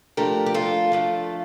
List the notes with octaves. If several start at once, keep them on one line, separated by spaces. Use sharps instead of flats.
F3 A3 D4 G4 A#4
G4
F4 A4
F3 A3 D4